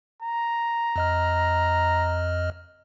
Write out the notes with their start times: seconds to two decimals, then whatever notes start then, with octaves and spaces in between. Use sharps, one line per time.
0.22 A#5
0.96 F2 D#5 F6